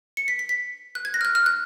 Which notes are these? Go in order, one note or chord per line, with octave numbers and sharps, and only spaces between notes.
C#7
B6
B6
B6
F#6
G#6
A#6
F6
F#6
F6
F#6